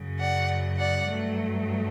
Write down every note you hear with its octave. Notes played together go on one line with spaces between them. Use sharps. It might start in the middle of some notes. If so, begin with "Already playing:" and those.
Already playing: F#2 C#3 F#3
D5 F#5
D5 F#5
G2 F#3 A3